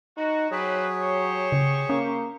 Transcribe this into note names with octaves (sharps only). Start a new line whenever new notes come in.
D#4 F#4
F#3 C4 G#4 B4 C#5
G4 C5 C#6
C#3
A#3 C#4